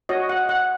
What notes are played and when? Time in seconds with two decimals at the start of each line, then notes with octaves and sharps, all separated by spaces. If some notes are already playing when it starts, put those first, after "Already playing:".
0.09 F#4 C#5 D#5
0.29 F#5
0.49 F#5